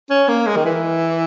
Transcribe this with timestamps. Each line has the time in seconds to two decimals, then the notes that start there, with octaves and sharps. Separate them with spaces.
0.10 C#4
0.28 A#3
0.47 G#3
0.56 D#3
0.65 E3